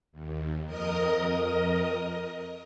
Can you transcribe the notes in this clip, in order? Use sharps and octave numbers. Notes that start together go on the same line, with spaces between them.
D#2
F2 A#4 D#5 D#6